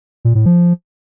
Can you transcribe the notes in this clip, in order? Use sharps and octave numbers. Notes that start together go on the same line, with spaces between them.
A#2
A2
F3